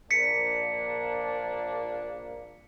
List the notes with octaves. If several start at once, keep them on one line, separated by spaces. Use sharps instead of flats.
A#1 A#3 D4 B6 C#7